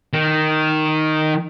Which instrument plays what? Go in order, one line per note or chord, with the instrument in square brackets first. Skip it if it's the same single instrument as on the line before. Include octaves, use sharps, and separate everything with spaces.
[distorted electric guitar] D#3